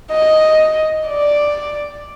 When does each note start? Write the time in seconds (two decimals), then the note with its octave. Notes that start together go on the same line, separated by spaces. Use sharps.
0.11 D#5
1.08 D5